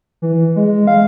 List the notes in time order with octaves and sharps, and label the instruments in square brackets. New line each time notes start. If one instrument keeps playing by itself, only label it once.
[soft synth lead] E3
G#3
F5